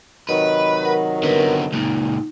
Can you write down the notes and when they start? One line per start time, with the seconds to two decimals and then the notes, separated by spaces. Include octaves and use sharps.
0.29 C3 D#3 F#3 B4 D#5
0.85 A#4 F#5
1.24 D3 B3 A#4 B4
1.72 C#2 A#2 D#4